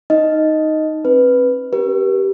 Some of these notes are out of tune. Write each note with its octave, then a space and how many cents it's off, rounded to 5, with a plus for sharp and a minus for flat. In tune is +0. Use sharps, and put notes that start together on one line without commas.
D#4 +0 D#5 +0
C4 +35 B4 +0
C#4 +0 G4 -10 A#4 +40